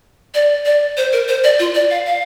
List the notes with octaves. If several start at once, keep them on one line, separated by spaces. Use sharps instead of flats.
D5
D5
C5
A#4
C5
D5
F4
D5
F5
F5